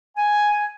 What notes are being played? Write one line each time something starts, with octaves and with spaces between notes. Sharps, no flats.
G#5